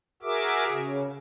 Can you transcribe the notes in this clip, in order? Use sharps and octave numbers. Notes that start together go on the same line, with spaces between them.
F#4 G#4 A#4 E5 D6
C#3